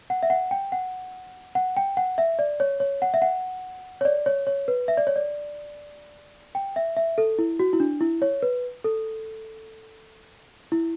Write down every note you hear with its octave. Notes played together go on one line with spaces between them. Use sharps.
F#5
E5
F#5
G5
F#5
F#5
G5
F#5
E5
D5
C#5
C#5
F#5
E5
F#5
C#5
D5
C#5
C#5
B4
E5
D5
C#5
D5
G5
E5
E5
A4
E4
F#4
E4
D4
E4
C#5
B4
A4
E4